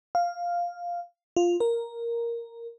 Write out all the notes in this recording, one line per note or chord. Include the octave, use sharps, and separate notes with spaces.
F5
F4
A#4